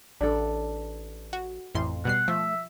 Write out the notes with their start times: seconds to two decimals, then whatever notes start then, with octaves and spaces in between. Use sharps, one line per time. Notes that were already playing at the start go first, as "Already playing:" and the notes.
0.21 A1 D4 A4
1.33 F#4
1.75 A1 F2 E3 C6
2.05 B2 G3 F#5 C7
2.28 F3 A3 E5